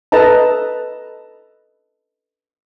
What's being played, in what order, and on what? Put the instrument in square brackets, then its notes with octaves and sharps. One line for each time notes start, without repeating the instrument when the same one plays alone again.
[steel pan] A4 B4 D#5 A5 A#5